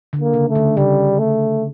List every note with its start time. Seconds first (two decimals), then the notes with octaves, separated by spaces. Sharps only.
0.13 D3
0.21 A#3
0.34 C#3
0.49 A3
0.55 D3
0.77 C#3 G3
1.19 A3